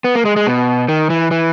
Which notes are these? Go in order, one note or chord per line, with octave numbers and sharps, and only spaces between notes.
B3
A#3
G#3
G#3
B2
D#3
E3
E3